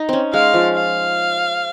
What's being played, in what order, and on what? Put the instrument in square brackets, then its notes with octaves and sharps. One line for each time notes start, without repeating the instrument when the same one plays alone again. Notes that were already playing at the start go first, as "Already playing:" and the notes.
Already playing: [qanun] D#4
C4 C#4
[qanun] G#3 [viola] F5
[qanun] F3
[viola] F5